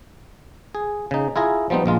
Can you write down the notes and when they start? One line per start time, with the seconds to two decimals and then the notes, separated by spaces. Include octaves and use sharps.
0.75 G#4
1.11 C#3 D#4
1.36 E4 F4 G#4 A#5
1.70 F3 G3 B3 C4 D#4
1.86 A#1 G#3 F4